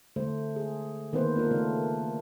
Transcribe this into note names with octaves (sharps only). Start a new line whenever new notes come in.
D3 A3 C5
G#4
D#3 A#3 B3 B4 C5
A#3 D4 F4 A#4
C#3 A3 D4